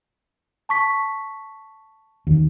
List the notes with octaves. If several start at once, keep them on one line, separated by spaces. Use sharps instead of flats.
A5 C#6 B6
D#2